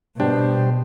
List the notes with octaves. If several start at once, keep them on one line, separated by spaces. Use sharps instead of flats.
B2 G3 D4 G4 C5 G5